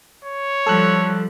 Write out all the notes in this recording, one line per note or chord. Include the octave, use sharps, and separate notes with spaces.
C#5
F3 G3 A4 E6 F#6